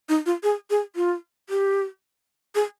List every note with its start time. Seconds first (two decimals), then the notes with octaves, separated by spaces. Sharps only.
0.09 D#4
0.26 F4
0.43 G#4
0.70 G#4
0.96 F4
1.50 G4
2.55 G#4